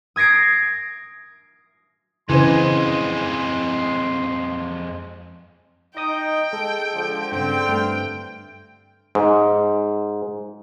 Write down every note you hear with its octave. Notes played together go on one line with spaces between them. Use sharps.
D#6 G#6 A#6 C7 D7
F2 C#3 E3 G#3 C5 C6
D#4 D#5 G5 D#6
G#3 A4
D3 F3
G2 C#3 C4 G5
G2 A3 F6
G#2